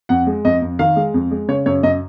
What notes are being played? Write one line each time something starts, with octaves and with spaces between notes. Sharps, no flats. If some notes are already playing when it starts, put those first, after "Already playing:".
F2 F#5
G#3
F2 D#5
F2
D#3 F5
G#3
F2
G#3
C#3 C#5
F#2 C#5
F#2 D#5